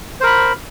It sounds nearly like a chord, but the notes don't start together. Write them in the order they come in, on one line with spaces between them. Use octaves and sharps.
C5 A#4 B5